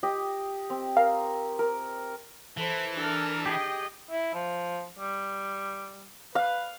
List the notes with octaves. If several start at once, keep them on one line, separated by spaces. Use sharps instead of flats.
G4 D#5
C4
A#4 F5
A#4
E3 A4 C5
D4 A4 A#4
G4 G#4 D#5 G5
E4
F3
G3
B4 F5